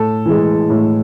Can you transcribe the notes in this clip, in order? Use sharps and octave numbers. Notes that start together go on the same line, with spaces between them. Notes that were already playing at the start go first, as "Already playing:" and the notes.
Already playing: A2 A4
E3 G#3
A2